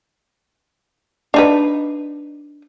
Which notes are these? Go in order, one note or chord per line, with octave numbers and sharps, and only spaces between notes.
D4 D#4 B4